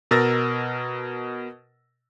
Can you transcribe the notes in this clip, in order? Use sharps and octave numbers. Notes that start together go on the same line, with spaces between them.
B2 A#4 E6 A6 A#6